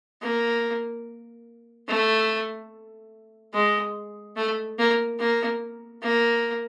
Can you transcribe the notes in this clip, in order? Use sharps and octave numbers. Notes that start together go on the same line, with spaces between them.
A#3
A3
G#3
A3
A#3
A#3
A#3